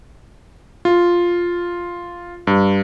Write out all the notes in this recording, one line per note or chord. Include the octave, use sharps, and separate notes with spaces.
F4
G2